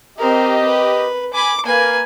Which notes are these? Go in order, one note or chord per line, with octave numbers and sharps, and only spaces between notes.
C4 G4 A#4 D#5
B4
G#5 B5 D6
A#3 B4 G#5